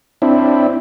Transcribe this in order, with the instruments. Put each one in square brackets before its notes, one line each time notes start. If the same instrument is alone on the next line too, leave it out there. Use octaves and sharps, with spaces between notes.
[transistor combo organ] C4 D4 E4